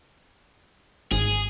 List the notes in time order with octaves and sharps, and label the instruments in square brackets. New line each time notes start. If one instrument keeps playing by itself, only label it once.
[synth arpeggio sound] G#1 [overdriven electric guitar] G#4